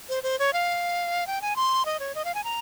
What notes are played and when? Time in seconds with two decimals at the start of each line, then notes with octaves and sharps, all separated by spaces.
0.09 C5
0.23 C5
0.39 C#5
0.53 F5
1.27 G5
1.42 G#5
1.56 C6
1.85 D#5
2.00 C#5
2.15 D#5
2.25 F5
2.35 G#5
2.44 A#5